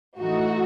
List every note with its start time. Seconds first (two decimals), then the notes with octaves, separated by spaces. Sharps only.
0.18 A2 E3 A3 D#4 F#4